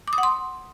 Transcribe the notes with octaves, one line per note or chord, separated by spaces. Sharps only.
D6
D#6
F#5
C6